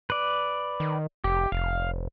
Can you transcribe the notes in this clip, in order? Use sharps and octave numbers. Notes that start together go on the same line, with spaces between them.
B4 D5
D#3
F1 G4
F1 F5